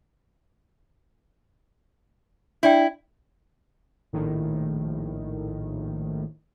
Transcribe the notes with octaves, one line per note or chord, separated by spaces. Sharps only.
D4 E4 D5 G5
A#1 A2 D#3